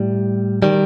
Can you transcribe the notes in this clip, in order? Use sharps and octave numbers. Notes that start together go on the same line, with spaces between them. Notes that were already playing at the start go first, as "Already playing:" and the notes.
Already playing: A2 G3
D#3 G3